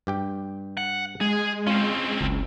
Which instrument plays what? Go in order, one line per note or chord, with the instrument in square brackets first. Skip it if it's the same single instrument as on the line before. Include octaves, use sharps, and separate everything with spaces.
[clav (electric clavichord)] G2 G4 G5
[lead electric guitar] F#5
[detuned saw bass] G#3 [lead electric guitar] G#4
[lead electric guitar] C4 C#4 [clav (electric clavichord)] F4
[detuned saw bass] F#1 [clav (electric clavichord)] C#2